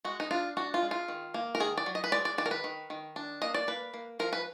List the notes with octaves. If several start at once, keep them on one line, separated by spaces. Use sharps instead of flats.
G#3 F#4
D#4
D4 F4
D4 F#4
F4
G#3
F4
D#3
A#3
A#4
D#3 G#4
D5
F#3
D#5
B4
G#3 D5
D5
D#3 D5
A#4
B4
D#3
D#3
D4
A#3 D#5
D5
A#3 B4
A#3
F3 A#4
B4